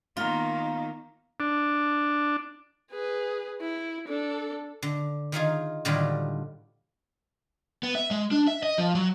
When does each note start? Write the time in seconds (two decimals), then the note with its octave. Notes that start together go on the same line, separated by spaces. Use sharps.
0.17 D#3 A#3 B3 F4 F5 A#5
1.40 D4
2.91 G#4 B4
3.61 E4
4.08 D4 A4
4.82 D3
5.32 D#3 D#4 F4 G#4
5.85 A2 D3 D#3 F#3 G3 F4
7.83 B3
7.95 E5
8.11 G#3
8.31 D4
8.47 E5
8.63 D#5
8.78 F3
8.95 F#3